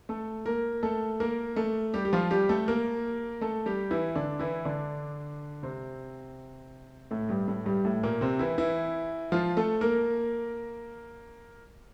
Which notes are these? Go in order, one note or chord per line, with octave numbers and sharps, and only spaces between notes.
A3 A4
A#3 A#4
A3 A4
A#3 A#4
A3 A4
G3 G4
G4
F3 F4
G3 G4
A3 A4
A#3 A#4
A3 A4
G3 G4
E3 E4
D3 D4
E3 E4
D3 D4
C3 C4
A2 A3
G2 G3
A2 A3
G2 G3
A2 A3
A#2 A#3
C3 C4
E3 E4
E3 E4
F3 F4
A3 A4
A#3 A#4